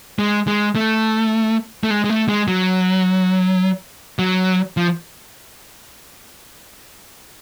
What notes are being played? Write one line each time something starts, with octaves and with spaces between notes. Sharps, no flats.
G#3
G#3
A3
A3
G#3
G#3
A3
G#3
F#3
F#3
F3